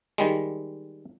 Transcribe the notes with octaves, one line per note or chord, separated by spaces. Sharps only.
D#3 G3 G#3